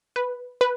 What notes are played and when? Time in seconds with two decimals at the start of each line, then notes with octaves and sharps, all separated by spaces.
0.16 B4
0.61 B4